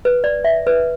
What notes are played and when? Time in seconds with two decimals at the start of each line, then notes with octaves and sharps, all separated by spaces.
0.05 B4
0.24 D5
0.44 E5
0.67 B4